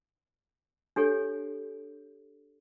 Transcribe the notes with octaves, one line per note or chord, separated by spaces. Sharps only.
D4 G4 A4 C#5